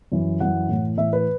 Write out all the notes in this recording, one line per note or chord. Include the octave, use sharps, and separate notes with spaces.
F#2 E3
F#2 E3 F#5
A2 E3
A2 E3 E5
B4